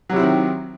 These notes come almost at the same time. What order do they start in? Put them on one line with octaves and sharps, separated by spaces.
F#3 C3 E4 C4 D#3